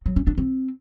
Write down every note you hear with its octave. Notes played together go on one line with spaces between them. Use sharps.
F#3
C#4
D4
C4